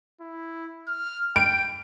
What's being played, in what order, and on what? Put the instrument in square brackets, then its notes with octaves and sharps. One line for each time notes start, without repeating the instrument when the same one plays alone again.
[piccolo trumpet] E4
F6
[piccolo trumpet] G5 [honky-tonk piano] D7